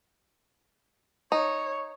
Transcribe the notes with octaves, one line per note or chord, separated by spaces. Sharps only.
D#4 C#5